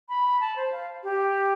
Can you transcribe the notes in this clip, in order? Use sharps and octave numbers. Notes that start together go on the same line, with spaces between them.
B5
A5
C5
F5
G4